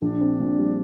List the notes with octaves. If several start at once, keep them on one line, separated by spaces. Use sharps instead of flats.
A#1 D4
C4
A#2
G3